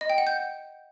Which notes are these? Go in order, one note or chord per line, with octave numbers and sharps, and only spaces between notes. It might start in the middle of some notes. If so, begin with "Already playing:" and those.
D#5
G5
F#5
G6